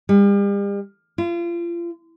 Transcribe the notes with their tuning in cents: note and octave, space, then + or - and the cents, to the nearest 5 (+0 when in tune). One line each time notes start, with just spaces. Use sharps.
G3 +40
F4 -35